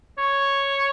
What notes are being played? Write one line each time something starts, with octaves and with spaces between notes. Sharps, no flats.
C#5